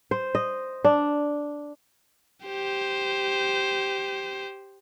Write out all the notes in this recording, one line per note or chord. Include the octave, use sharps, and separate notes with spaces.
C5
D#5
D4
G4 C5